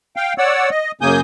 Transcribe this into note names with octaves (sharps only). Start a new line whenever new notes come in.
F5 G5
C#5 D5 F#5 E6
D#5
F#2 C#3 A#3 G#5 D#6 G6